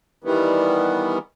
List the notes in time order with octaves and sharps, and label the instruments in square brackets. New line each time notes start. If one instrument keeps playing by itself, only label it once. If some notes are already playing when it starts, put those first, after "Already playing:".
[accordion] D#3 E3 G3 B3